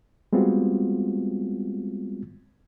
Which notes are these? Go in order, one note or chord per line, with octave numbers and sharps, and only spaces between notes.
G3 G#3 B3 C4 F4 F#4